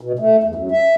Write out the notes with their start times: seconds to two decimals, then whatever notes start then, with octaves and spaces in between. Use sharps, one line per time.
0.01 B2
0.19 A3
0.43 E2
0.55 F#2
0.71 E5